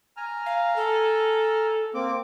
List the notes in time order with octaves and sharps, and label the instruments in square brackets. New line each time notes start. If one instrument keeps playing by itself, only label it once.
[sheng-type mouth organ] G#5 A#5 F6
[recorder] F5
A4
[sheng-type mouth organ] A#3 C4 D6